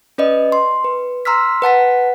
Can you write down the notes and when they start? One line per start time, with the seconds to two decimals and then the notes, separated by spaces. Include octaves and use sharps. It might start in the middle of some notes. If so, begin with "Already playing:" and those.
0.18 C#4 B4 D5 D#5
0.52 C6
0.84 B4
1.25 A#5 C6 E6 F6 B6
1.62 B4 F#5 A5 B6